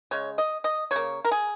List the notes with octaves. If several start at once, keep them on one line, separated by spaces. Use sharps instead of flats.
C#3 G#3 C#5
D#5
D#5
C#3 A#3 C#5
A#4
G#4